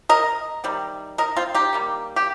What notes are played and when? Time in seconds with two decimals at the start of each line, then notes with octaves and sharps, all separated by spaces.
0.09 A#4 D#5
0.64 C3 D#3 G3
1.18 A#4 D#5
1.37 C4 F4
1.54 D#4 G4
1.73 D#3 G3 A#3
2.16 G4